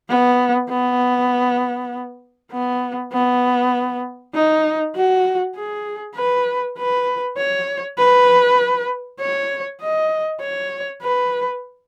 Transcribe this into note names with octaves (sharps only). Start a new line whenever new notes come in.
B3
B3
B3
B3
D#4
F#4
G#4
B4
B4
C#5
B4
C#5
D#5
C#5
B4